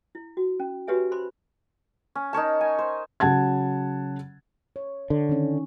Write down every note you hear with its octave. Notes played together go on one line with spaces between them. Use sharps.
E4
F#4
C#4
F#4 G4 B4 C#5 E5 G#5
C5 B5 C6
C#4
D#4 A#4 C#5 A5
G#5
C5
C#3 F#3 F#5 A5 G#6
C#5
D3
D#3 C#4